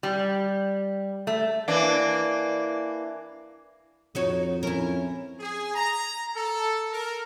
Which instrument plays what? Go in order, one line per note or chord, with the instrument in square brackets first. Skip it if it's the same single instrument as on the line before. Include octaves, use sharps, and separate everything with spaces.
[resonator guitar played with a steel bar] G3
A3
[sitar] E3 A#3 D4
[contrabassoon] F2 [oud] D#4 F#4 C#5
[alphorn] C#4 [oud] E4 A#4
[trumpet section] G#4
A#5
A4
A#4